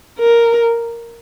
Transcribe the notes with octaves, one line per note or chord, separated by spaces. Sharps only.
A#4